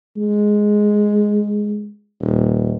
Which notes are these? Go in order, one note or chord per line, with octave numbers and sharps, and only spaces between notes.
G#3
D#1